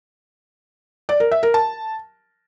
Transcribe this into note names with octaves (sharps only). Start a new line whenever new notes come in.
D5
A#4
E5
A#4
A5